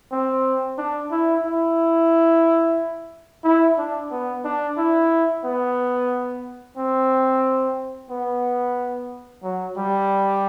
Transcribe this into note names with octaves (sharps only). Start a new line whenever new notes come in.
C4
D4
E4
E4
E4
D4
B3
D4
E4
B3
C4
B3
F#3
G3